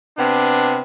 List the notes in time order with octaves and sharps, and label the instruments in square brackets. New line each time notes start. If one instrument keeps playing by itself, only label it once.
[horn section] C3 B3 D4